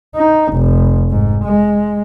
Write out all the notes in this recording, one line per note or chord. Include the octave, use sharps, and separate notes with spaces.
D#4
F1
G#2
G#3